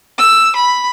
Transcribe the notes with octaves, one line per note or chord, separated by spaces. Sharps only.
E6
B5